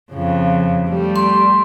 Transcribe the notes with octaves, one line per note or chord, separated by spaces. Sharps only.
F2 C#3
G3 A3
C6